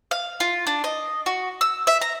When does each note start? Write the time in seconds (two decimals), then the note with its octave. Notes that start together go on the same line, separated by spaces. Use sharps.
0.11 F5
0.40 F4
0.67 D4
0.84 D#5
1.26 F#4
1.61 E6
1.87 E5
2.01 A#5